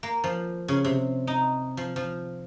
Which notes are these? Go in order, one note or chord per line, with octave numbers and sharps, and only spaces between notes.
A#3
F3
C#3
C3
D#4
F3
F3